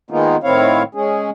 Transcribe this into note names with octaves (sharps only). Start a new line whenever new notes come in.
D#3 G#3 A#3 B3 D#4 F4
A2 D#3 C4 E4 C#5 F5
G#3 C#4 G#4